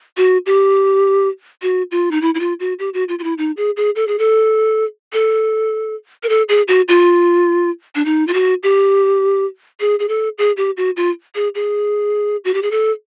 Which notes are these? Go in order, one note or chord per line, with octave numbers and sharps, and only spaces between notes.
F#4
G4
F#4
F4
D#4
E4
E4
F4
F#4
G4
F#4
F4
F4
E4
D#4
G#4
G#4
A4
G#4
A4
A4
A#4
A4
G#4
F#4
F4
D4
D#4
F4
F#4
G4
G#4
G#4
A4
G#4
G4
F#4
F4
G#4
G#4
F#4
G4
G#4
A4